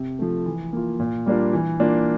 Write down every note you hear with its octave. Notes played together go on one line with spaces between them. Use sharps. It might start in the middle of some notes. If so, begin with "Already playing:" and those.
Already playing: C3
F3 A3
E3
A#3 F4
A#2
G3 A#3 D4 F4
E3
A#3 D4 F4